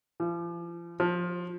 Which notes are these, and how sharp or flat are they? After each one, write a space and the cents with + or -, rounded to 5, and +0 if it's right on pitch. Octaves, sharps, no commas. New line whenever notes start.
F3 -40
F3 +15